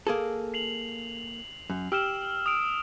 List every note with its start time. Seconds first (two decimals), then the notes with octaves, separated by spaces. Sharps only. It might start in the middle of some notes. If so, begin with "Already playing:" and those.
0.07 A#3 G#4 A4
0.54 C7 F7 F#7
1.70 F#2
1.92 G4 E6 F6 E7
2.46 D#6 D7